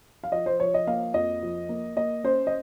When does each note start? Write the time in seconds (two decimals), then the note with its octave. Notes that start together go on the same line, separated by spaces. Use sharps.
0.24 F5
0.32 F3 D#5
0.46 C5
0.60 F3 C#5
0.74 D#5
0.87 A#3 F5
1.14 F2 D#5
1.42 F3
1.69 A#3
1.97 A#3 D#5
2.24 C#4 C5
2.47 D#5